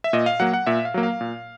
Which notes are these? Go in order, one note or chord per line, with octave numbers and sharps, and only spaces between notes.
E5
A#2 D#5
F5
F#3 A#3 F#5
F#5
A#2 E5
F5
F#3 A#3
F5
A#2